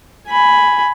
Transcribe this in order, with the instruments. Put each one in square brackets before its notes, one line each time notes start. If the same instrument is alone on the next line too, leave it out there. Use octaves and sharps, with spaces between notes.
[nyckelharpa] G#5 B5